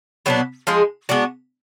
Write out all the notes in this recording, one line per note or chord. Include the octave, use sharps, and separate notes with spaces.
B2 F#3 B3 D4
F3 G#3 D#4 G#4
G#3 B3 D4 F#4